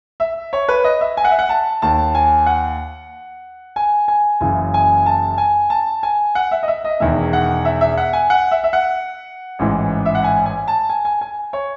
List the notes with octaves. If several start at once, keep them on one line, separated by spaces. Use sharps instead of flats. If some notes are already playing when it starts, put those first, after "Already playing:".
E5
C#5
B4
D#5
E5
G#5
F#5
E5
F#5
A5
D#2 D#3 A5
G#5
F#5
G#5
G#5
F#1 F#2 C#3 E3 G#5
G#5
A5
G#5
A5
G#5
F#5
E5
D#5
E5
D#5
E1 E2 D#3 E5
F#5
E5
E5
F#5
G#5
F#5
E5
E5
F#5
A1 G#2 E3
E5
F#5
G#5
G#5
A5
G#5
G#5
G#5
C#5